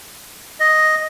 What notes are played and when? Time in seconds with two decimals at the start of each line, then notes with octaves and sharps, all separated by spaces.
0.60 D#5